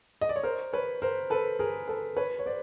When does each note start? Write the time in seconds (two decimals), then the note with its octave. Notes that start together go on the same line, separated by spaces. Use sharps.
0.21 D#5
0.29 D5
0.36 C#5
0.43 A#4 C5
0.73 B4 C#5
1.02 A#4 C5
1.30 A4 B4
1.59 G#4 A#4
1.88 A4 B4
2.17 B4 C#5
2.39 C#5
2.46 C5 D5